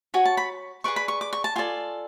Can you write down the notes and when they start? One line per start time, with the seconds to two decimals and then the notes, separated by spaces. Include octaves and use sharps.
0.14 F#4 C#5 G#5
0.25 A5
0.37 B5
0.84 G#4 B4 D5 C#6
0.96 B5
1.08 C#6
1.21 D6
1.33 C#6
1.44 A5
1.56 F4 A4 D5 G#5